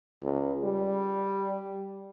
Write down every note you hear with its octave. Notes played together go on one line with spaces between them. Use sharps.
C#2
G3